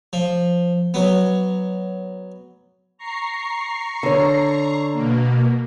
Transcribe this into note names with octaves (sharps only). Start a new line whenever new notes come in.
F3
F#3 B3
A#5 C#6 C7
D3 C#5
B2 A#3